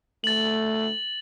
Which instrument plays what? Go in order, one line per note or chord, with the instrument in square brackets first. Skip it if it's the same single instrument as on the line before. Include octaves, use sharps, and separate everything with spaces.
[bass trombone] A3 [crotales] A6 F#7